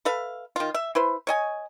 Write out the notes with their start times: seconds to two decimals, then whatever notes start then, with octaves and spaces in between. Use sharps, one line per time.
0.05 A4 B4 E5 F5
0.56 D#3 F4
0.74 E5
0.95 E4 B4 C5
1.27 C#5 D#5 G#5